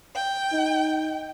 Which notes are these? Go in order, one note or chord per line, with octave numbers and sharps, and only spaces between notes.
G5
D#4